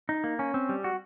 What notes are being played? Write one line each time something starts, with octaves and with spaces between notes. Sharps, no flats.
D#4
A#3
C#4
C4
G3
F#4